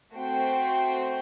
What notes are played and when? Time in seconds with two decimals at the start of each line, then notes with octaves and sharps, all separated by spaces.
0.14 A3 C4 F#4 C5 G5